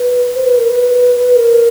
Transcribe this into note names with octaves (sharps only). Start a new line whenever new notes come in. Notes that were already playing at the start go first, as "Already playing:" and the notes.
Already playing: B4
C5
B4
A#4
B4
B4
A#4